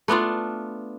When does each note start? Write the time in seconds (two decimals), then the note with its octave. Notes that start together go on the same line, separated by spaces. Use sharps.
0.08 A3 B3 D4 F4